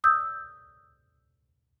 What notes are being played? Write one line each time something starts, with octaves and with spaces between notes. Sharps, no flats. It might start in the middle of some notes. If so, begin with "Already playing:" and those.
D#6 E6 G6